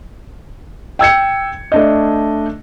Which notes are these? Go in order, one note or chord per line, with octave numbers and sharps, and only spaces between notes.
G5 E6 G#6 C#7
A3 D4 D#5